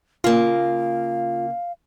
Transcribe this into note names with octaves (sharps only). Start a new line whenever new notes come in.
C#3 A#3 F4 F5